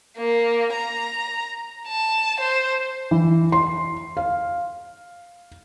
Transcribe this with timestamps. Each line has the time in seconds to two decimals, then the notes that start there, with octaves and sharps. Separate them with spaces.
0.17 A#3
0.73 A#5
1.87 A5
2.40 C5
3.11 E3
3.52 C6
4.17 F5